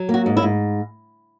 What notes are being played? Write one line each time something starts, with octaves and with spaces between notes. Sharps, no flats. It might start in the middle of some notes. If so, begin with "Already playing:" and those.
Already playing: F#3
A#3
F#4
G#2
E4
G#2